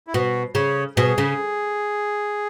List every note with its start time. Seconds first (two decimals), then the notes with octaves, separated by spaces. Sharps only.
0.07 E4
0.14 B2 F#4
0.55 C#3 C#5
0.96 B2 G#4
1.18 C#3